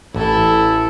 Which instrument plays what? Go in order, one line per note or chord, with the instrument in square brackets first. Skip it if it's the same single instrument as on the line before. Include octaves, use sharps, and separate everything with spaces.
[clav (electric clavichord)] A1 [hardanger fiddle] E4 A4